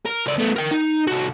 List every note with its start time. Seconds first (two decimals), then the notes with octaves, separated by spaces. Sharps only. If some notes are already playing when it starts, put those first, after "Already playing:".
0.06 A#4
0.26 C#2 D5
0.39 A3 B3
0.56 A#4 G5
0.71 D#4
1.07 C2 F#4